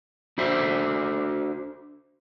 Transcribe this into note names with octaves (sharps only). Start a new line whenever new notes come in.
D4 F#4 C5 E5